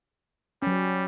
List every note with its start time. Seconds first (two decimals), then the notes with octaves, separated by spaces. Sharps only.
0.62 F#3 G3 C#4